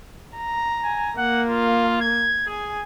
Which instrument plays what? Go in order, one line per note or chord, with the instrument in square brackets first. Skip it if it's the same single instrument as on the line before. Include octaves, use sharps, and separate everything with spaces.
[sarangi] A#5
[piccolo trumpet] G#5
[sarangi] A#3 [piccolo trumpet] F#5
[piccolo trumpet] F4
G#6
[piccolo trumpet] G#4 [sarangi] G#5